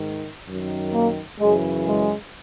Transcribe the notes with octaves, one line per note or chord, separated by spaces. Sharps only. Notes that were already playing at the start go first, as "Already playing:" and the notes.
Already playing: G#2 D#3
F#2 D#3
A#3
F#2 C#3 E3 G#3
G#3